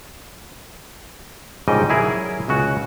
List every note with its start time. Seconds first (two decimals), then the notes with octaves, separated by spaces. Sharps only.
1.68 A#1 G#2 C#3 G3 D#5 G5
1.89 F#3 E4 G#4 A#4
2.48 C#2 C#3 F#4